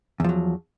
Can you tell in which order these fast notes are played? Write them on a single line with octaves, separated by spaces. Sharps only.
E2 F3 F#3